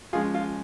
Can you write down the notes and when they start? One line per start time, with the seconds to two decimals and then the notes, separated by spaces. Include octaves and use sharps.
0.13 F3 G#3 C#4 F4 G#4
0.34 F4